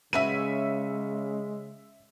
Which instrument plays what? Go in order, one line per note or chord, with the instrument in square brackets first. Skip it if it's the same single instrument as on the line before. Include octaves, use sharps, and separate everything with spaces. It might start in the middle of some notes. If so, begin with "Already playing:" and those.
[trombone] C#3 [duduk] G#3 [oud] C#4 F#4 B4 [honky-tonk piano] E5 D#7